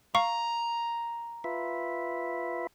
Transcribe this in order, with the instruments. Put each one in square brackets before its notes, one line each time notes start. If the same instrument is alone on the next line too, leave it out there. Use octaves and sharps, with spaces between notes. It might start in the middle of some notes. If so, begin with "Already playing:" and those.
[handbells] F5 C#6 [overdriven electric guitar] A#5
[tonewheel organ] F4 B4 E5